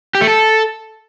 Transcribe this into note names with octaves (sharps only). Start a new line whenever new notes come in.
G4
A3
A4